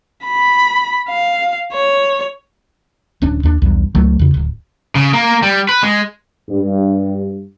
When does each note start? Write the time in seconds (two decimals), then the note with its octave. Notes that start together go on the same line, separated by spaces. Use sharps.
0.25 B5
1.09 F5
1.73 C#5
3.22 D1 C#4 D4
3.43 D#2 D4
3.62 B1 E2 G2
3.95 C#2 F#3 A3
4.19 E2 C#3
4.34 D1
4.95 C#3
5.13 A#3
5.43 G3
5.69 B4
5.83 G#3
6.50 G2